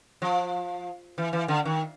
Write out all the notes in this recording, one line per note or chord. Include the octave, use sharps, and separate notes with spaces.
F3
E3
E3
D3
D#3